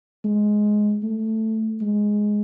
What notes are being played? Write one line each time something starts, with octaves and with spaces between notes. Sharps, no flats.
G#3
A3
G#3